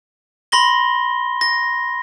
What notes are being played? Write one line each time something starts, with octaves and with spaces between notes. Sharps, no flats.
B5 C6 A#6 G7
A#6